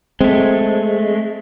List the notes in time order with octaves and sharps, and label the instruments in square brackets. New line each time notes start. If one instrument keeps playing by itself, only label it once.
[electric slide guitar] G#3 A3 [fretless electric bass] C4